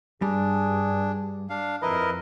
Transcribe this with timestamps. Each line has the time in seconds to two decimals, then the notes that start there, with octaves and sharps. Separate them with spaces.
0.22 G2 G3 D4 G#4
1.50 D4 F5
1.82 F2 E4 A#4 B4 D#5